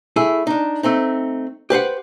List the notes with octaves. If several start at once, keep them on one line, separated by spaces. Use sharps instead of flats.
A3 E4 G#4
D4 D#4
A3 C4 D#4
G4 B4 C5 F#5